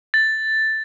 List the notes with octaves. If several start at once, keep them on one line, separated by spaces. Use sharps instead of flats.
A6